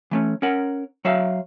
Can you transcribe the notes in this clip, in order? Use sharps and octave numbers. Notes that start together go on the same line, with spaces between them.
E3 A3 C#4
C#4 A#4 F#5
F#3 C#5 E5 F5